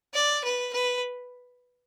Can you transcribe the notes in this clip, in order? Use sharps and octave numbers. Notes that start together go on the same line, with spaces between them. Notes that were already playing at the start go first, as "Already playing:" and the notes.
D5
B4
B4